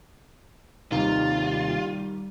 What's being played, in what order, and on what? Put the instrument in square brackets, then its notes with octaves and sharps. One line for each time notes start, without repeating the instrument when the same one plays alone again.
[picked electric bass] D#2 C3 [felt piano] D#3 [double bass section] G3 [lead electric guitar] F4